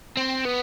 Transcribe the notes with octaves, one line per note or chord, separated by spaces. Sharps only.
C4
B3